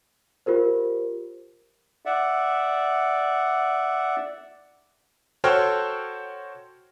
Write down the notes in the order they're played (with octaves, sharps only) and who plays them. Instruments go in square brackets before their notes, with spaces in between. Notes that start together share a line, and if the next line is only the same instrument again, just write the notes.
[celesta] F4 G4 A#4 C5
[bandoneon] D5 E5 F#5
[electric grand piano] F#4 A4 C5 C#5 G5 F6